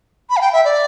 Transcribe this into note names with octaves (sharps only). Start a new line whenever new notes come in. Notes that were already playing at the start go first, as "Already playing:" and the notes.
B5
F5
G5
E5
D5